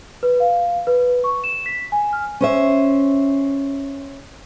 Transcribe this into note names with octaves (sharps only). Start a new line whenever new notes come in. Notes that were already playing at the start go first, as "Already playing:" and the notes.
B4
F5
B4
C#6
E7
B6
G#5
F6
C#4 C5 E5